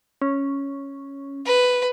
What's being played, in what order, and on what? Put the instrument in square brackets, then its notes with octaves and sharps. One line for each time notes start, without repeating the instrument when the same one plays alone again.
[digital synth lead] C#4
[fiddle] B4